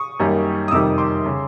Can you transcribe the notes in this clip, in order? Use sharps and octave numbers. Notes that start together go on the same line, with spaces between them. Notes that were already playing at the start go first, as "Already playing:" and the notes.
Already playing: C#6 D#6
F#2 D#3 G3 A#3
D#6
F2 C3 D#3 G3 D6 E6
C6 D6
C#3